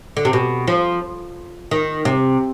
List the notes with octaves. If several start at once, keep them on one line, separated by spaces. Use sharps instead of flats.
D3
C3
B2
F3
D#3
C3